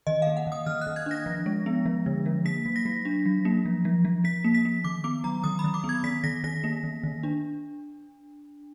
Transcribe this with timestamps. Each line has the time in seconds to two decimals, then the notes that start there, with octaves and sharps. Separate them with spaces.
0.07 D#3 D#5
0.22 A#3 F5
0.37 F#5
0.47 D#3
0.52 D#6
0.66 D#3 F6
0.81 F#6
0.87 D#3
0.96 G#6
1.06 D4 A#6
1.26 F3
1.46 G#3
1.66 B3
1.86 F3
2.06 D3
2.26 F3
2.45 A#3 B6
2.65 F#3
2.76 A#6
2.85 F#3
3.05 D4
3.25 F#3
3.45 A#3
3.65 F3
3.85 F3
4.05 F3
4.24 F3 B6
4.44 A#3
4.54 B6
4.65 A#3
4.84 D#3 D6
5.04 B3 D6
5.24 F#3 A#5
5.44 D#3 D#6
5.59 B5
5.64 D#3
5.74 D6
5.84 B3
5.89 G#6
6.04 D#3 B6
6.24 D#3 A#6
6.44 D#3 A#6
6.64 A#3
6.83 D#3
7.03 D#3
7.23 D4